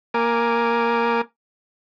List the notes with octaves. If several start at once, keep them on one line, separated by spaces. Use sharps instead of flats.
A#3 A#4 G#5 D6